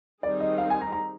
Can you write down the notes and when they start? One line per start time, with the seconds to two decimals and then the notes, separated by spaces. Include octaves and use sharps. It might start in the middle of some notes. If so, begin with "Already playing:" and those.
0.23 D#3 G3 C4 D#4 G#4 D5
0.40 D#5
0.58 F5
0.70 G#5
0.81 A#5
0.92 A#5